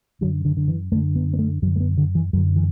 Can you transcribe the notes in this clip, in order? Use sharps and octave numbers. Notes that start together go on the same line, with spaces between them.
F#2 D3 F#3
D3
D3
E3
F#2 D3 A3
B3
B3
A3
F#2 D3 F#3
A3
B3
D3
E3
F#2 D3 F#3
E3